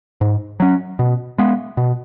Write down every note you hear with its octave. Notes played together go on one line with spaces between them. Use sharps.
G#2
F#3 C#4
B2
G#3 B3
B2